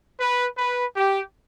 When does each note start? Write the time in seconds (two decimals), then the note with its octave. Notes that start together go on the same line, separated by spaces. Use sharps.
0.20 B4
0.58 B4
0.96 G4